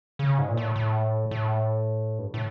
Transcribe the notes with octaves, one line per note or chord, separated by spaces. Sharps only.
C#3
G#2
A#2
A2
A2
A2
G2
A2